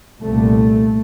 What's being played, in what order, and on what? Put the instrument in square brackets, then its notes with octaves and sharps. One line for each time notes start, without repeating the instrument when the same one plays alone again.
[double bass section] C2 A#2 A3